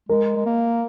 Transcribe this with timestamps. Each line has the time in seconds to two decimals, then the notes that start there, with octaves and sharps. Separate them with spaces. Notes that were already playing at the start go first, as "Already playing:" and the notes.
0.09 G#3 A#4
0.36 G#3
0.46 A#3